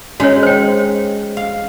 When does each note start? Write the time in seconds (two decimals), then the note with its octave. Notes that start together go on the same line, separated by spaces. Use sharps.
0.20 G#3 C#4 D#4 F#4 C#5
0.43 C5 C#5 G5
1.37 F5